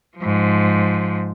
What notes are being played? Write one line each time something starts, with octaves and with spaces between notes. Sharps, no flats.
G#2 F3